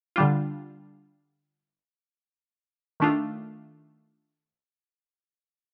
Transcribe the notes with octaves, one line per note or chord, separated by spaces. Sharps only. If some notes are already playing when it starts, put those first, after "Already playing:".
D3 G3 D4 F4
D#3 A3 D4 F4